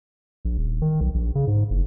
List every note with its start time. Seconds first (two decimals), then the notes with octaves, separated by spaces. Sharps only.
0.45 A#1
0.58 D#1
0.82 D#3
1.01 B1
1.14 A#1
1.35 C#3
1.47 G#2
1.70 F#1